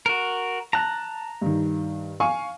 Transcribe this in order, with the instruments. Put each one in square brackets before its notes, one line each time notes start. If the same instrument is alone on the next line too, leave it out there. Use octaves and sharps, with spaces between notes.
[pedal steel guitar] F#4 A#4
[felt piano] A5 [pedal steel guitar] A#5 F#6
[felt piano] G2 D#3
F5 G#5 C#6